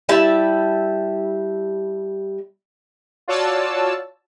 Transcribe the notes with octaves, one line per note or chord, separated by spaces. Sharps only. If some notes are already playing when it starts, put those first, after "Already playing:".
G3 E4 E5 A5
F4 F#4 C#5 D5 A5 E6